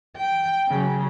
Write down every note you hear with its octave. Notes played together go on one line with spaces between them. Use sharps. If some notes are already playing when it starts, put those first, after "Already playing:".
G5
C#3 F#3